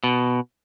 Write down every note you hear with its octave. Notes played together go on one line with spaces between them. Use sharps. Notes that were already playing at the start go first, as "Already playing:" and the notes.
B2